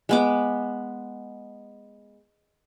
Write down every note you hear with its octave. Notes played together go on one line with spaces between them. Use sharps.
G#3 B3 D6